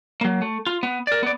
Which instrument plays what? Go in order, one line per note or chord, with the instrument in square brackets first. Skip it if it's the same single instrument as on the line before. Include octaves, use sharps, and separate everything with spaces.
[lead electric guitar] F#3 A#3
A3
F4
B3
A#4 D5
B3 D5